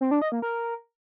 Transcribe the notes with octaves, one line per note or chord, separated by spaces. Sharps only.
C4
D4
D#5
A#3
A#4